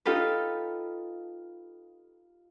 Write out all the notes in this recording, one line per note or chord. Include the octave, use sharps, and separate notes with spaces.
D#4 F4 G4 A4 B4